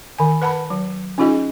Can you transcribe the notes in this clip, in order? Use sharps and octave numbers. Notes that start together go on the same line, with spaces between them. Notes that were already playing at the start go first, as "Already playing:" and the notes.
D#3 G#5
B4 F#5 A5 B5
F#3
C#4 D#4 F4 G#4 D#5